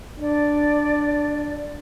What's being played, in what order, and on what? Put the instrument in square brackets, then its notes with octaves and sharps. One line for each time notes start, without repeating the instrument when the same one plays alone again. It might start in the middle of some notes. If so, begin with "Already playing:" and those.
[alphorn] D4 [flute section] D5